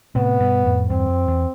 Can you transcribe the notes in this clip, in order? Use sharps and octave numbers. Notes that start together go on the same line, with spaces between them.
A2 C3 B3
G2 B2
F2 A2
E2 G2 C4
F2
E2